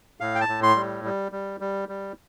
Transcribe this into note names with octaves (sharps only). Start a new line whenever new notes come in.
A2 F5
G5
A5
A2
C6
G3
G3
G3
G3
G3